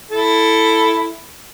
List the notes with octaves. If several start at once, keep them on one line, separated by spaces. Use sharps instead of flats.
E4 A4